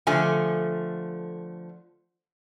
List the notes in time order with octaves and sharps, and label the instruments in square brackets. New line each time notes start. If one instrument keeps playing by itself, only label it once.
[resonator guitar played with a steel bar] D3 F3 A3 G#5